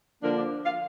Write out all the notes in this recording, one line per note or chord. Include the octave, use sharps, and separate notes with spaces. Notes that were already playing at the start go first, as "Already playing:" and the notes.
D3 F3 A#3 D4 A#4
D5
F5